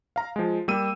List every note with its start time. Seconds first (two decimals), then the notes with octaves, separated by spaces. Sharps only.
0.16 F5 A#5
0.36 F3 G#3
0.68 G3 A#3 E6 D#7